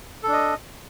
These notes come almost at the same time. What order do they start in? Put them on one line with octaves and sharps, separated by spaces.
A4 D4 D#5